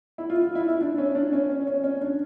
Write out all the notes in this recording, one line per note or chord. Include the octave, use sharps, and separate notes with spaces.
E4
F4
F4
E4
E4
D4
C#4
D4
C#4
C#4
C#4
C#4
D4